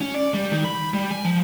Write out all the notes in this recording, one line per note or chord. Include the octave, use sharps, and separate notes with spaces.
C#4
D5
G3
D#3
B5
G3
G#5
F3